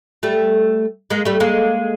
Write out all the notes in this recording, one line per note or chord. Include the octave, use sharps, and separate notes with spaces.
G3 A3
G#3 A#3
G3 A3
G#3 A#3